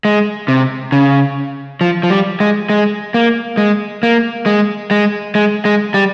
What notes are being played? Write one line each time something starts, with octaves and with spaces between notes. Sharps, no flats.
G#3
C3
C#3
F3
F3
G3
G#3
G#3
A#3
G#3
A#3
G#3
G#3
G#3
G#3
G3